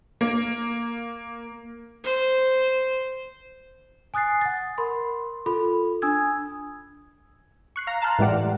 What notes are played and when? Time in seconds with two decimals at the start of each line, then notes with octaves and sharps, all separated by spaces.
0.21 A#3
2.04 C5
4.14 G#5 D#6 F#6 A6 C7
4.41 F#5 A6
4.78 A#4 B5 C6
5.46 F4 A4 B5
6.02 D4 G#5 D#6 E6 G#6
7.76 C#6 F#6 C7
7.87 F5 A#5
8.02 A5 A#5 C6 F6 F#6
8.19 A2 E3 G#3 G4 D5 F#5